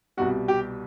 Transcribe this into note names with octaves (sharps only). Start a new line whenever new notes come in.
C2 B2 G3 F#4
G4